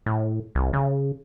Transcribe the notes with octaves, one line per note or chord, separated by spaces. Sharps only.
A2
C2
C#3